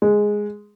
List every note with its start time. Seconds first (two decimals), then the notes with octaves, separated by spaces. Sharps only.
0.02 G#3